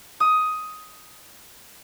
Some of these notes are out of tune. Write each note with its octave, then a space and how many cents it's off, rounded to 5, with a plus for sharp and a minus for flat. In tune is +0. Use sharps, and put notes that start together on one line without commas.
D#6 +10